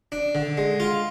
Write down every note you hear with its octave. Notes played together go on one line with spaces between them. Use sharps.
D4
D3
G#3
F4